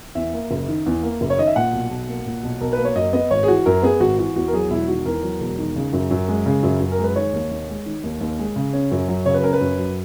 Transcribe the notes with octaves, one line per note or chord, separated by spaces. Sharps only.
E2 E5
A#3
F#1
D#3
E2
A#3
F#1
C#5
D#3 D#5
E5
A#2 F#5
B1
B1
A#3
A#2
B1
B1 A#4
A#3 B4
C#5
F#2 D#5
B3 D#5
G#1 C#5
G#4
E3 F#4
F#2 A#4
B3 G#4
G#1 F#4
E3 F#4
E2 F#4
A#4
F#3 G#4
E1 E4
D#3 F#4
E2 A#4
F#3
E1
D#3
C#3
F#2
F#2
G#3
C#3
F#2
F#2
A#4
G#3
B4
D#3 C#5
D#2
D#2
G#3
D#3
D#2
D#2
G#3
C#3
C#4
F#2
F#3
C#3 C#5
B4
C#4 A#4
B4
F#2
F#3